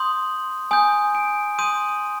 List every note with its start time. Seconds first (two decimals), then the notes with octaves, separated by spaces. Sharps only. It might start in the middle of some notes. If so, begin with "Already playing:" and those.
Already playing: C6 D#6 G6
0.71 G#5 D#6 G6
1.15 D7
1.59 C6 D#6 G6 D#7